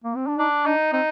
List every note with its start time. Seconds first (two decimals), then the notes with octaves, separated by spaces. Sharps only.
0.04 A#3
0.16 C4
0.27 D4
0.38 D4 D#4
0.66 D4 D#4
0.93 C4 D#4